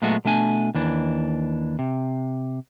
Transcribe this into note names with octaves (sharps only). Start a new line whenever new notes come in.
A#2 F#3 G#3 A3 B3 F#4
B2 A3 D4 G#5
D#2 E3 D4
C3